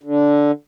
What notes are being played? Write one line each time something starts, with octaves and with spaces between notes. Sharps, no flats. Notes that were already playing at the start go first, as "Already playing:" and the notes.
D3